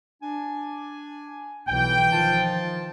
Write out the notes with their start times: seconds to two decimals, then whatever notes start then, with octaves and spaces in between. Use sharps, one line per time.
0.22 D4 G#5
1.68 B1 E3 G5
2.12 D#3 F3 F4 A5